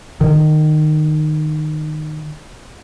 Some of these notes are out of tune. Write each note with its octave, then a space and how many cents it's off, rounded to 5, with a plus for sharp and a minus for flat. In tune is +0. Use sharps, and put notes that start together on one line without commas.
D#3 -20